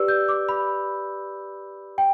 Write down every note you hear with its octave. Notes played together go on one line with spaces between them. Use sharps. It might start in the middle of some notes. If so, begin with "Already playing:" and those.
Already playing: G4 B4 D5 E6
G6
D6
B5
G5